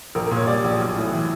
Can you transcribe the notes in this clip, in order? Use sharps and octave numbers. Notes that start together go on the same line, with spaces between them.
A#1 A#4
A#4
A#2
C#5
G3 D5
A#1
B1
A2
E3